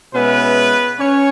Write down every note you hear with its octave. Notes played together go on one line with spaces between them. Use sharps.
B2 G#3 B3 C#4 E4 B4
C#4 C#5